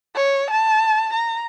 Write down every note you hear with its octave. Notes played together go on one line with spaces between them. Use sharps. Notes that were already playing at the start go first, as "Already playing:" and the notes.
C#5
A5
A#5